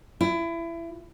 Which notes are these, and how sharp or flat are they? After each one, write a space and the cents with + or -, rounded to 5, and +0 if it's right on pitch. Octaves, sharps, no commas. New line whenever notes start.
E4 +25